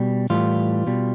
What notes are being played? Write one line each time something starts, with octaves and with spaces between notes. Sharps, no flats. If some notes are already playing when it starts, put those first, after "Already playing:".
Already playing: B2 G3
A2 E3 G3 F4
B2 G3